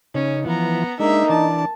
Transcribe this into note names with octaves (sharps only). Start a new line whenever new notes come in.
C#3 C#4 D#4
E3 F3 B3 A#5
G#3 A#3 D4 D#4 E5
E3 D4 D5 A5